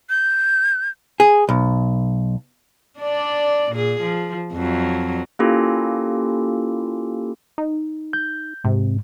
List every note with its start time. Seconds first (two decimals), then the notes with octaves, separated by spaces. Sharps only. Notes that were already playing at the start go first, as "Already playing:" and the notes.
0.10 G6
1.20 G#4
1.49 B1
3.00 D4 D5
3.72 A#2 G#4
4.02 F3
4.53 F2 F#3
5.39 A#3 C#4 E4 F4 G4 A4
7.58 D#4
8.13 G6
8.64 G#2 C3